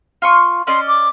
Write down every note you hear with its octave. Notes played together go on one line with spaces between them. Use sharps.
F4 C6 C#6
C#4 D5 D#5 C6
D6